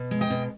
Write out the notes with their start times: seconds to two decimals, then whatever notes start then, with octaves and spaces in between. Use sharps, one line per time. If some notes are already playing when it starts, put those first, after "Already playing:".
Already playing: B2
0.11 G#3
0.21 D#5 G5
0.30 B2